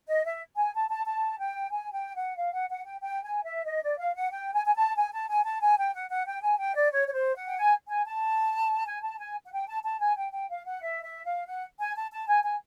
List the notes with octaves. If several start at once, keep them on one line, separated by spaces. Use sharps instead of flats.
D#5
E5
G#5
A5
A5
A5
G5
G#5
G5
F#5
F5
F#5
F#5
G5
G5
G#5
E5
D#5
D5
F5
F#5
G5
G#5
G#5
A5
G#5
A5
G#5
A5
G#5
G5
F#5
F#5
G5
G#5
G5
D5
C#5
C#5
C5
F#5
G5
G#5
G#5
A5
G#5
A5
G#5
F#5
G5
A5
A5
G#5
G5
G5
F5
F#5
E5
E5
F5
F#5
G#5
A5
A5
G#5
G#5